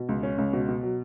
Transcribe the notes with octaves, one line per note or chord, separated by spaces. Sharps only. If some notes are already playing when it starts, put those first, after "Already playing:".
Already playing: B2
C#2
C#4
C#2
B2
B2
F#3